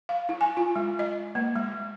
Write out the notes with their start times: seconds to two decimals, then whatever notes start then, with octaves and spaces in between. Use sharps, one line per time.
0.09 F5
0.29 E4
0.41 G#5
0.57 F4
0.76 G#3
0.99 D#5
1.35 A#3
1.56 G#3